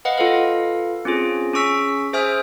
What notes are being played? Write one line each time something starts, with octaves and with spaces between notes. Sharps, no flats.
B4 D#5 F5 F#5
F4 A4 B4 F5
C4 C#4 F4 G#4
C#4 G#4 C#6 E6 B6
G#4 C5 E5 G#5 D#6 F6